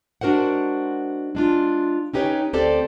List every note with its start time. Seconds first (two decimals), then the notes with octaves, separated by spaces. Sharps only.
0.21 G#3 D4 F#4 A#4 C5 F#5
1.35 G#3 D4 F4
2.13 C#4 D#4 G4 B4 C#5
2.53 D2 C4 G4 A4 C5 D5